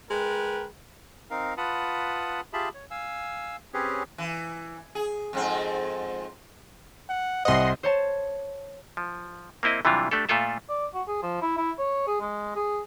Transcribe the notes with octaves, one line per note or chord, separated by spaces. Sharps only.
G#3 A#4 B4 G5
C4 D#4 A#4 F5
F4 B4 F#5 A5 B5 D#6
F4 G4 G#4 E5 A5 B5
C#5
F5 G#5 E6
C4 C#4 G4 G#4 B4 C#5
E3
G#4
F2 G#2 C4
F#5
C2 C5 D#5 F#5 C6
C5 C#5 A5
F3
A#3 C4 E4 D#5
C3 E3 F#3 G3 D4 F4
A3 D4 G4 A4
A#2 A3 F4 A4 E5
D5
F#4
G#4
F3
E4
E4
C#5
G#4
G#3
G#4